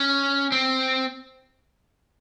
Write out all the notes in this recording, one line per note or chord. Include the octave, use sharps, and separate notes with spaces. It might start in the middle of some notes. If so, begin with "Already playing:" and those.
Already playing: C#4
C4